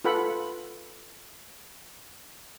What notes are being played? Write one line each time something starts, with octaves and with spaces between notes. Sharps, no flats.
F4 A4 B4 F#5 B5